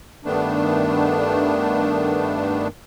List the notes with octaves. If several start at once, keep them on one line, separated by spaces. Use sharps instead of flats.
G2 D#3 A3 B3 D4